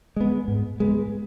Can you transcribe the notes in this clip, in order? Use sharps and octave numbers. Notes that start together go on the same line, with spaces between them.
G#3 B3
G#2
G#3 B3